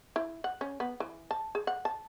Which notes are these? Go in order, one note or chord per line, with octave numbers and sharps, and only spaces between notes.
E4
F#5
C#4
B3
E3
A5
G#4
F#5
A5